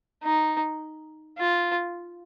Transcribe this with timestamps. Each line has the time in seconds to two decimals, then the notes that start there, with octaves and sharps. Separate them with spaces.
0.24 D#4
1.39 F4